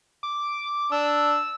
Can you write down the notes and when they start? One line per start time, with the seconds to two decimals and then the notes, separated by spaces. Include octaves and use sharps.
0.23 D6
0.92 D4 E6